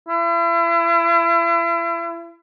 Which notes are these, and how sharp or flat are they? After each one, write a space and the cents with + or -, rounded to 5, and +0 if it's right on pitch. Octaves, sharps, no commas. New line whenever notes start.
E4 +40